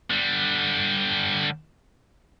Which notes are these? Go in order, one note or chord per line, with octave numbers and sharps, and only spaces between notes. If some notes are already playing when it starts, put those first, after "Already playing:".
D3 G3